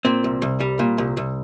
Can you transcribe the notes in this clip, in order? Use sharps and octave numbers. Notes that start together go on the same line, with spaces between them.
A#2 C4
C2
C2
G3
A#2
C2
C2